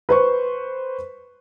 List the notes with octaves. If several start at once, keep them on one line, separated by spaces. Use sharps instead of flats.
B4 C5 C#6